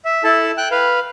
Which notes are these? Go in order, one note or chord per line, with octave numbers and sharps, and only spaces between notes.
E5
E4 A4 A5
G5 F#6
B4 F5